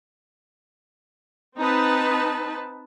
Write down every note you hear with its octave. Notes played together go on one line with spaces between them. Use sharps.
C4 D#4 B4 A5